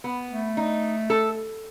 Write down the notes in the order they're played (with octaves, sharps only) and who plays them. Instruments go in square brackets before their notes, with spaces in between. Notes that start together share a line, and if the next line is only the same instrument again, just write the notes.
[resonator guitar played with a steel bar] B3
[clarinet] A3
[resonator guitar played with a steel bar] D#4
A4